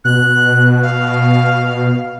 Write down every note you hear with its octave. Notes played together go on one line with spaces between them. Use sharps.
B2 F#6
F5